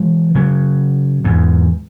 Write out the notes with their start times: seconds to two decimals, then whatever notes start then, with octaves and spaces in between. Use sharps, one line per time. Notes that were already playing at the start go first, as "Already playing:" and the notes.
Already playing: E3 G#3
0.35 C#3 F#3
1.24 E2 G#2